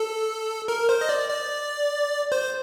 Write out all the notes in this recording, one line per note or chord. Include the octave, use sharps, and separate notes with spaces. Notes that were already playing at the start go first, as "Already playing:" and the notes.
Already playing: A4
A#4
C5
D#5
D5
D5
C5